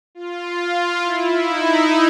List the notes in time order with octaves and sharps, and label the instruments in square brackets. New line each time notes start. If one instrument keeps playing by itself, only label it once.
[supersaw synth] F4
E4
D#4